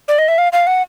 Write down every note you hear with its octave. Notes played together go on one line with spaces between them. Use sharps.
D5
D#5
E5
F5
F5
F#5